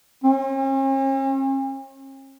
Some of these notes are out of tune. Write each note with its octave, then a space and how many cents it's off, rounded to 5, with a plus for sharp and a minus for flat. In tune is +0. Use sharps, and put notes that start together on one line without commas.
C#4 -45